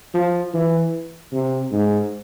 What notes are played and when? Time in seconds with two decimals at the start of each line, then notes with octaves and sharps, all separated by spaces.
0.14 F3
0.54 E3
1.32 C3
1.72 G#2